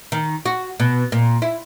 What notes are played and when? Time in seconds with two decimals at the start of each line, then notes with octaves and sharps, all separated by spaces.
0.12 D#3
0.46 F#4
0.80 B2
1.12 A#2
1.42 E4